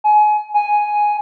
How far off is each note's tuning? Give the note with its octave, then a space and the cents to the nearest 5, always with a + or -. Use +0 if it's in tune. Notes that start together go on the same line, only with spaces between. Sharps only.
G#5 +30
G#5 +0